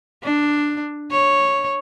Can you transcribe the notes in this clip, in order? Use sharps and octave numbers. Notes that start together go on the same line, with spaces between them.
D4
C#5